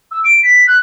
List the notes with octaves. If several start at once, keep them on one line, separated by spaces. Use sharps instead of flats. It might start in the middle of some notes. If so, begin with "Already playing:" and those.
E6
D7
B6
F#6